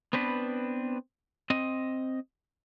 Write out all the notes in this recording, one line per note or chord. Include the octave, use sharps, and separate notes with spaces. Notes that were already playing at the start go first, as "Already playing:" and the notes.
B3 C4 D4 B4
C4 D#5